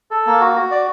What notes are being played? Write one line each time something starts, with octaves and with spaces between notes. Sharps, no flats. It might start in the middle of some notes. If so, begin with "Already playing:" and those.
A4
A#3
F#4
F#4
D5